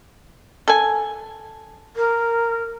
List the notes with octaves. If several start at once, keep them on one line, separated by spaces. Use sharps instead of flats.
A4 G#5
A#4